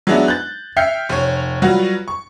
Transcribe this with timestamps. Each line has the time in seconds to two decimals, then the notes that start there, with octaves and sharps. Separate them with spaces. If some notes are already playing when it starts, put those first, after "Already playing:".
0.07 F#3 G#3 B3 D4 E4 F#4
0.28 F#6 G6 A6
0.77 E5 G5 F6 G6 C7 C#7
1.09 F1 C#5
1.62 F#3 G3 F4 F#4 B4
2.08 C#6